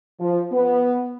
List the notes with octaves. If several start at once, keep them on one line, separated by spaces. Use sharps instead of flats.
F3
B3